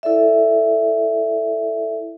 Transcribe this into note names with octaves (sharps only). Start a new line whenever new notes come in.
E4 A4 D5 E5